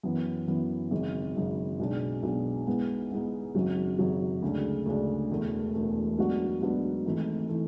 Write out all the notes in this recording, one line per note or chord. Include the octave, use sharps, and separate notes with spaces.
F#2 E3 B3
F#2 E3 B3
G#1 F#2 C#3
G#1 F#2 C#3
B1 B2 G#3 D4
B1 B2 G#3 D4
G#2 G#3 B3 E4
G#2 G#3 B3 E4
G#1 F#2 C#3 F#3
G#1 F#2 C#3 F#3
D2 C#3 G#3 D4
D2 C#3 G#3 D4
E1 E2 B2 A3
E1 E2 B2 A3
G#2 F#3 B3 D4 F#4
G#2 F#3 B3 D4 F#4
G#1 G#2 E3 A3 E4
E3 A3 E4